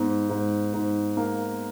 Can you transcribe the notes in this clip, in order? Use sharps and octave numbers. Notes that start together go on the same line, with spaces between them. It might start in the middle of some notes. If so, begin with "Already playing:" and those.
Already playing: G#2 B3
G#2
G#2
A#3